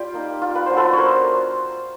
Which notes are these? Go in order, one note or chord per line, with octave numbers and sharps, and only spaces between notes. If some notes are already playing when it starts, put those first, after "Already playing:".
Already playing: G3 F4 G4
A#3 D#4
F4
B4
F#3 B3 D4 F4 C5
A4 B4
C#5
A#4 C5